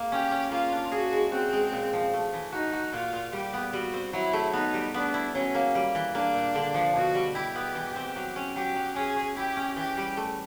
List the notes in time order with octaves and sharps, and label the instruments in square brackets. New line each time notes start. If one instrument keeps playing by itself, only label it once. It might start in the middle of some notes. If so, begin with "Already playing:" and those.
Already playing: [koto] A#3
[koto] C#4 [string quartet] G4
[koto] C#4
[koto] A#3 [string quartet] F4
[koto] D4
[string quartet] F#4 [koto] G#4
[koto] G#3
[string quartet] C4 [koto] F#4
[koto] G#3
A#2
F3
A3
E3
[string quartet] D#4 [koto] F#4
[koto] F#4
[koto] A#2 [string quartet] F4
[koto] A#2
[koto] G3 [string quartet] G4
[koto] B3
[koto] G3 [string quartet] F#4
[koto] C4
[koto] F#3 [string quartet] E4
[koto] A3
[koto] B3 [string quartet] D#4
[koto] G3
[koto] B3 [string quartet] D4
[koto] E4
[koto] F#3 [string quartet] C#4
[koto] A#3
G3
E3
[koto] A#3 [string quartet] D4
[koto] A#2
D3
F3
[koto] B2 [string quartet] F#4
[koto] G3
[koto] E4 [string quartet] G4
[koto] B3
E3
C4
F#3
C#4
[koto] F#3 [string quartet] G4
[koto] F#3
[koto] C#4 [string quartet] G#4
[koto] C#4
[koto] E4 [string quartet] G4
[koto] C#4
[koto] E3 [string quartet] G4
[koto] G3
A3